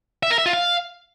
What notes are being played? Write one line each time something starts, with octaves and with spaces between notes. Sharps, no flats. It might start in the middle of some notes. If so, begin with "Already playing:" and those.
E5
A#4
E5
F4
F5